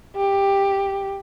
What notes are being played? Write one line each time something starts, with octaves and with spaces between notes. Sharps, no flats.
G4